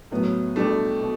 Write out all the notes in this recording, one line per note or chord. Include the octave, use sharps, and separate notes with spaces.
A2 F#3 B3
B2 G3 A3 D4 G4
B2